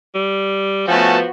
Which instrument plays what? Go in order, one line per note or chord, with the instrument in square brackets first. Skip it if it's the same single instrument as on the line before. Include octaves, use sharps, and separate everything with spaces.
[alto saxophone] G3
[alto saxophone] F3 [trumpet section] A3 C#4 A5 [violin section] B3 F#4